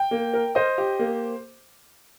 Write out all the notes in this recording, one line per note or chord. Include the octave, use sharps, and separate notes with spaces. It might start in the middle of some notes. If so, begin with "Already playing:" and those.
Already playing: G5
A#3
A#4
C5 D#5
G4
A#3